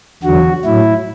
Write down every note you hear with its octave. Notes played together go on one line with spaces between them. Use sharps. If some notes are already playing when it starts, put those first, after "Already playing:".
E2 D3 F#3 F#4
A2 F#3 E4